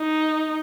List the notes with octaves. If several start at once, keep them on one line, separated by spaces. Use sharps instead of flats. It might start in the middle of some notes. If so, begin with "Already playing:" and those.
Already playing: D#4